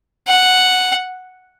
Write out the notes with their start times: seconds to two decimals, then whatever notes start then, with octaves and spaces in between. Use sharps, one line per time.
0.28 F#5